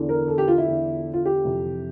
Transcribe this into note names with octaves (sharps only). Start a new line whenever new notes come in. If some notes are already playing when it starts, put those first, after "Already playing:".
Already playing: E2 D3
A#4
A4
G4
F4
E4
E2 D3
F4
G4
F2 C3 E3